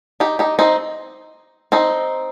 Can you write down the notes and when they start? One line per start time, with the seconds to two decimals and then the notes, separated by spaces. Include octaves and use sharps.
0.20 D#4 G4
0.39 D#4 G4
0.59 C4 D#4
1.72 C4 D#4